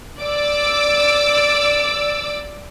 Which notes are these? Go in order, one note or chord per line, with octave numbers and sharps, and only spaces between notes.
D5 D6 E6